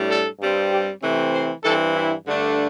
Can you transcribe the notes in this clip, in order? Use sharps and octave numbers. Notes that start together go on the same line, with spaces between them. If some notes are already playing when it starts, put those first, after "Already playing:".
Already playing: A2 G3 D4
A4
G2 G3 C4
G4
C3 E3 A3 C4
C5
G2 E3 C4 A4
E4
G2 D3 A3 D4